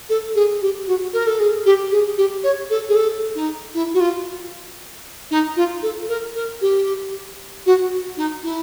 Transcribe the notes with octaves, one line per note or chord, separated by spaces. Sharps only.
A4
G#4
G4
F#4
A#4
A4
G#4
G4
G#4
G4
C#5
A4
G#4
A4
D#4
E4
F#4
F4
D#4
F4
A4
A#4
A#4
G4
F#4
D#4
E4